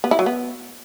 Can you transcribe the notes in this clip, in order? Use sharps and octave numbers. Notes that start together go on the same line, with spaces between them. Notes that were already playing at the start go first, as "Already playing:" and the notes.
B3
E4
F#3
B3